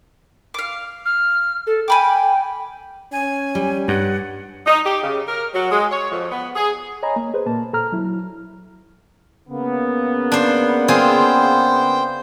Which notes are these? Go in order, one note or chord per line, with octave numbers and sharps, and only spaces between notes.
F5 D6
F6
A4
G5 G#5 B5 D6
C#4 G#5
G3
G2 F#5
D#4
G4
C#3
A#4
F#3
G#3
C#5
F2
B3
G#4
C#5 D#5 G#5 A#5 B5
A#3
G#4 B4 C5
A#2 A#3 A5
A#2 A4 A#5 F6
F#3 E4
C#3 A#3 B3
D4 C5
C4 F4 G#4 C5 G5